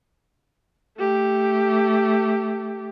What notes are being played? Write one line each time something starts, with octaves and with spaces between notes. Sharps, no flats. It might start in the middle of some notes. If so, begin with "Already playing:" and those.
A3 G4